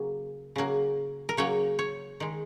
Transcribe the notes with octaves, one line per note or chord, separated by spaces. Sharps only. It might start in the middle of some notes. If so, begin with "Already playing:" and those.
Already playing: C#3 F#3 A#3
C#3 F#3 A#3
A#4
C#3 F#3 A#3 C#5
C#5
D#3 G#3